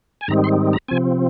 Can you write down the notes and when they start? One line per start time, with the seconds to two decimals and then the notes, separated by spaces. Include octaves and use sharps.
0.21 G#5
0.28 G#2 D#3 G3 C4 D#4 A#5
0.44 C6
0.73 A#5
0.88 C3 F3 C4 G#5